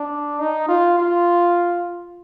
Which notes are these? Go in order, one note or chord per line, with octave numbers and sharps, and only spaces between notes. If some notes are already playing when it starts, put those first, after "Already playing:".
Already playing: D4
D#4
F4
F4